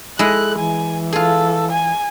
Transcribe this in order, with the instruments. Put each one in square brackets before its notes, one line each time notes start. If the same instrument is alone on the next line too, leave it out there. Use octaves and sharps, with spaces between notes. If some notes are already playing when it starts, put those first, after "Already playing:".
[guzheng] G#3 E4 D#5 [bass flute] A4 [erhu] F#6
[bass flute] E3 [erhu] G#5
[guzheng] F4 G#4 [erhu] A4
[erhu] G#5